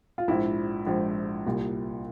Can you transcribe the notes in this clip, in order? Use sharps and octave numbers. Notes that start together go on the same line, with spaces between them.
F4
A#1 G#2 F3 E4
A#1 G#2 F3
C2 A#2 G3